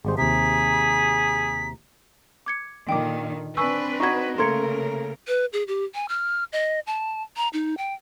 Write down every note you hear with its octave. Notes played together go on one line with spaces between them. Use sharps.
G#1 G3 G#4 C5
D#2 C3 G#4 A#5 B6
D6 G#6 C#7
A#2 D3 D#3 G5 D6
C4 D4 B4 G#5 C#6 E6
D#4 F#4 C#6 G#6
C#3 A3 A#3 A#4 C6 G#6 C#7
B4
G#4
G4
G#5
F6
D#5
A5
A#5
D#4
G5